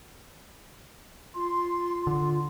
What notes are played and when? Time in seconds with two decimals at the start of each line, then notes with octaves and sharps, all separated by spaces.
1.35 F4 C6
2.07 D3